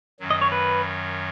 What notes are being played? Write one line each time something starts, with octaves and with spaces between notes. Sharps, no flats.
F#2 D#3 F#3
D#5
C#5
B4